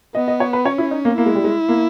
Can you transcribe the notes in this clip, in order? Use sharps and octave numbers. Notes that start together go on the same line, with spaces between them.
B3 D#5
D#5
C#5
B4
C#4 C#5
E4
D#4
A#3
A#3 E4
G#3
G3
G#3
A#3